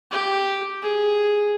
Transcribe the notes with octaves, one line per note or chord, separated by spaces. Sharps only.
G4
G#4